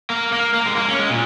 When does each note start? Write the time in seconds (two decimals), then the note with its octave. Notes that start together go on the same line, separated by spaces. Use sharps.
0.10 A#3
0.33 A#3
0.54 A#3
0.66 G#3
0.77 A#3
0.88 C#4
0.99 G#3
1.10 A#2